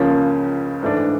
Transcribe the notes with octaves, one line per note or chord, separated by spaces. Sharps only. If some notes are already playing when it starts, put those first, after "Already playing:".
Already playing: C#2 C#3 F3 A#3 C#4
G#2 E3 A3 D4